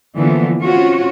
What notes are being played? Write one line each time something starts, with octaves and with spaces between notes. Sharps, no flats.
D3 E3 F3 A#3 B3
C4 C#4 F4 F#4 C#5